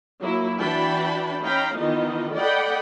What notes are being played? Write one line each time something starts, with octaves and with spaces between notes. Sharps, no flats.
F#3 A#3 E4
E3 D4 F#4 G5 A5 B5
C#4 D#4 F5 G5 A#5 B5
D#3 E3 B3 D#4 F4 D#5
A4 D5 D#5 F#5 G5 B5